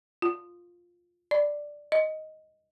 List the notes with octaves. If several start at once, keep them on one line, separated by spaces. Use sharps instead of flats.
F4
D5
D#5